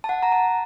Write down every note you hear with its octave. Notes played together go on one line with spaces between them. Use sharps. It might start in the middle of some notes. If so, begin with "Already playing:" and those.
A5
F#5
A#5
A5